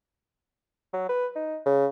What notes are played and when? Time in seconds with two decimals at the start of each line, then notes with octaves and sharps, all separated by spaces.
0.93 F#3
1.09 B4
1.36 D#4
1.66 C#3